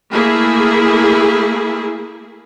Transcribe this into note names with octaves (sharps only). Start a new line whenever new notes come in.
A3 A#3 E4 G#4